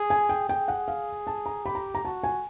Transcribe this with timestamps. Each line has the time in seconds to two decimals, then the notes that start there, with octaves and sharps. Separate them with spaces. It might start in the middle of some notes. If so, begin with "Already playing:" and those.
Already playing: G#4
0.10 G#5
0.29 G5
0.49 G#4 G5
0.68 F#5
0.88 F5
1.27 A5
1.46 A#5
1.65 G4 B5
1.75 A#5
1.95 A#5
2.04 F#4 A5
2.23 G#5